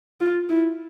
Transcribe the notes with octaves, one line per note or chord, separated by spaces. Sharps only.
F4
E4